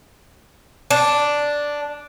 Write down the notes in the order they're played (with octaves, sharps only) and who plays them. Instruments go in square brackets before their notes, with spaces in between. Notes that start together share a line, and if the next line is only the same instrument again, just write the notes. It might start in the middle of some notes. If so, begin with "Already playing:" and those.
[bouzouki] D4